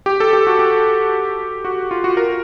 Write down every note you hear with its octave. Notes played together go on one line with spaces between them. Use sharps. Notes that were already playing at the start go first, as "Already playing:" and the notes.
G4
A4
G4
F#4
G4
F#4
F4
F#4
A#4